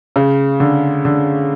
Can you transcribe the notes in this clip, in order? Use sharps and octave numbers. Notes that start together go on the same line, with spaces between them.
C#3
D3
D3